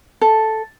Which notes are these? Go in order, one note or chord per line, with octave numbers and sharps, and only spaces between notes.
A4